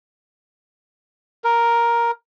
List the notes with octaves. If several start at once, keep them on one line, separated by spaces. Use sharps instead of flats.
A#4